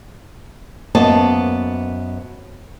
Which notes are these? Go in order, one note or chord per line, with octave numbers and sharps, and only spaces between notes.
F#2 A#3 B3 C5 D#5 A5